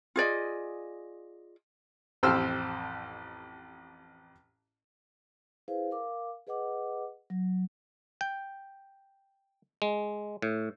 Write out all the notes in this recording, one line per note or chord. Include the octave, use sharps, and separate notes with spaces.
F4 G#4 D5 D#5
A1 F2 G4 C5 E6 F6
E4 G#4 B4 C5 F5
A#4 F5 D6
G#4 B4 D#5 F#5 D6
F#3
G5
G#3
A2